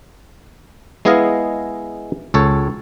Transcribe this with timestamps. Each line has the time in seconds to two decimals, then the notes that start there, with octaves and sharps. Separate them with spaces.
1.05 G#3 B3 E4 G#4 D#5 F5
2.34 C#2 A4 C#5